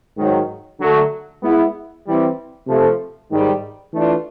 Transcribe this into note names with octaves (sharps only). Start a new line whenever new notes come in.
G#2 D#3 F#3
D3 F#3 A3
G#3 B3 E4
E3 G3 C4 E4
C3 F3 A3
G#2 D#3 G3
E3 A3 D4 F4